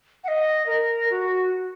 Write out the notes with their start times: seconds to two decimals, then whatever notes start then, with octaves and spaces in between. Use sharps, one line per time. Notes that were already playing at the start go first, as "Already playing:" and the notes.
0.24 F#5
0.28 D#5
0.67 A#4
1.10 F#4